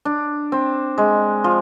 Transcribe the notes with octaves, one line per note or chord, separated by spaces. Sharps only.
D4
C4
G#3
F3